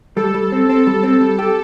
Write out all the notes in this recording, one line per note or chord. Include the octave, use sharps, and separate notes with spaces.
G3 A4
G3
C4
C4 A4
G3
C4
G3
G4